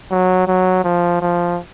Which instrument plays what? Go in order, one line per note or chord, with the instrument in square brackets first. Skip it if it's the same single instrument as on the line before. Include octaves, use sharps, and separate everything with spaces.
[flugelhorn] F#3
F#3
F3
F3